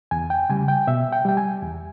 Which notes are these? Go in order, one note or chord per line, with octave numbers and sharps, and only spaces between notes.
E2 G#5
G5
C#3 G3 G#5
G5
B2 E5
G5
G3 G5
G#5
E2